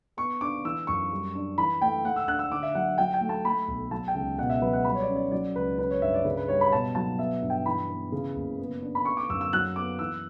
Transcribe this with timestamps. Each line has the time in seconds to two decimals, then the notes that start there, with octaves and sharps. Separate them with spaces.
0.17 B3 C#6
0.41 D4 D6
0.65 E3 E6
0.87 F#2 C#6
1.12 G3
1.35 D4
1.58 E3 B5
1.81 A3 G5
2.05 A3 F#5
2.16 E6
2.27 D4 F#6
2.39 E6
2.52 D3 D6
2.63 E5
2.75 F#3 F#5
2.98 F#3 G5
3.14 G5
3.21 A3
3.29 A5
3.45 A3 B5
3.68 B1
3.91 F#3 A5
4.08 G5
4.14 C#2
4.39 B2 F#5
4.50 E5
4.62 F#3 B4
4.73 F#5
4.85 G3 B5
4.95 C#5
5.00 D5
5.09 C#4
5.16 D5
5.31 F#3 D5
5.56 C#2 B4
5.78 C#4 B4
5.91 C#5
6.02 G2 E5
6.14 D5
6.25 C#3 B4
6.37 B4
6.48 G3 C#5
6.61 B5
6.72 B2 A5
6.95 F#3 A5
7.19 B3 E5
7.42 G2
7.50 G5
7.66 E3 B5
7.89 B3
8.12 C#3
8.36 F#1
8.59 B3
8.82 D4
8.95 B5
9.05 B3 C#6
9.17 D6
9.29 F#2 E6
9.41 E6
9.53 F#3 F#6
9.76 B3 D6
9.99 E3 E6